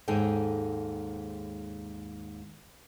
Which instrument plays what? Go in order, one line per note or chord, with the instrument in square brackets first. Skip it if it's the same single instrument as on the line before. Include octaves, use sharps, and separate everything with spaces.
[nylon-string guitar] D#2 G#2 D#4 G#4 A4 G5